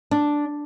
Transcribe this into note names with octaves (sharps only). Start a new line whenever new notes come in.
D4